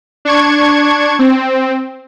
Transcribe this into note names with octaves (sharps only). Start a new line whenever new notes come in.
D4 C#6 G#6
C4